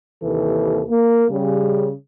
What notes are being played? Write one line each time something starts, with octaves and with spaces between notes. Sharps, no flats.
D#2 C3 D#3 E3 A#3 A4
A#3
C#3 G3